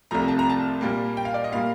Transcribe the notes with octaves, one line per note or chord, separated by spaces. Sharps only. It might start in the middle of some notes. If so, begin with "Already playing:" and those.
C2 C3 F3 A3 A#5
A5
A#5
A5
A#2 G3 A#3
G5
F5
D5
D#5
A#2 G3 A#3 F5